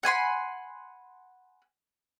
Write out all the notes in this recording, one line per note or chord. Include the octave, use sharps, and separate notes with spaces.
F#5 G#5 B5 C6